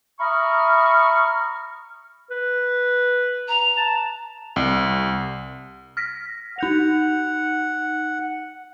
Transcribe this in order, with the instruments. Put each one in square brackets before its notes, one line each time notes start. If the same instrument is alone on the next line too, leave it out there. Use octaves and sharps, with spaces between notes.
[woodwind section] E5 A#5 B5 C#6 D#6 F6
[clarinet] B4
[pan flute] A#5
[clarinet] A5
[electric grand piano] C2
[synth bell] F6 A#6 B6
[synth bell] D#4 G6 F7 [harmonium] F#5